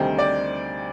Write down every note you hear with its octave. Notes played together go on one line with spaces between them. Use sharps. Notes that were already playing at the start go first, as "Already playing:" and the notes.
Already playing: D2 C3 D#3 G3 C5
D5